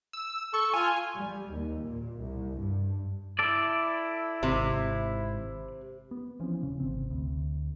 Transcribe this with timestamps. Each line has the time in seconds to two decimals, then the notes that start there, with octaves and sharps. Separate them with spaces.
0.13 E6
0.54 A4 C#6
0.74 F4 G#5
1.18 G3
1.53 D#2
1.87 A#2
2.21 C2
2.59 G2
3.39 E4 A4 D5
4.43 G#1 C3
6.11 B3
6.40 E3 F3 C4 C#4
6.62 D#1 C#3 E3
6.80 G#1 C3 C4
7.10 D2